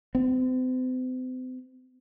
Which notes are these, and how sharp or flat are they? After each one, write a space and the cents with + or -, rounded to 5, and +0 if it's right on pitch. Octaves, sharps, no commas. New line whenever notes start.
C4 -40